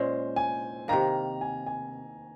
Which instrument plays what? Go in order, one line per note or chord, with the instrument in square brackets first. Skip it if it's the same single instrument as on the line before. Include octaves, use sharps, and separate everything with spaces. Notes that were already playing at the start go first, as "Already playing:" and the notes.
Already playing: [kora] A#2 G#3 C#4 [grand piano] C5
[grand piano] G#5
[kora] C3 D#3 A#3 [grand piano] A#5
[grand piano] G#5
G#5